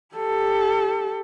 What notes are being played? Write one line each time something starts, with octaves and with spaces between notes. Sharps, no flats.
G4 A4